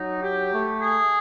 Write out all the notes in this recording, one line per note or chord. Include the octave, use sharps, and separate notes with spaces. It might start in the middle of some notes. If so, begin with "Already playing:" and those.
Already playing: F#3 D#4
G4
A3
G#4